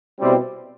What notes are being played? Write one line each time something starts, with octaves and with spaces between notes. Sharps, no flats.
B2 G3 C4 E4